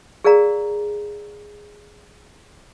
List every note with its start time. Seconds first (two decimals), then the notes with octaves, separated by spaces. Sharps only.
0.24 G#4 A#4 D5 F5 A#5